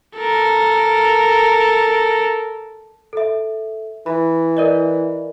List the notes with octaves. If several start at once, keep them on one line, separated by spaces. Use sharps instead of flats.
A4 A#4
A4 E5
E3 B5
A#4 D5 D#5